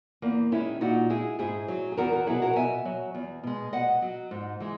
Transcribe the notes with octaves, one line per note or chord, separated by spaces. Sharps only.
E2 A#3
D#3 G#3 C#4 E4
A#2 D#4 F#4
G#3 E4 G#4
G#2 E4 G#4
F#3
G#4
E2 F#4 A#4
F#4 A#4
B2 F#3 E4 G#4
F#4 A#4
B2 E5 G#5
F#3
E2
B2 G#3
B2 D#5 F#5
F#3
G#2
E3 G#3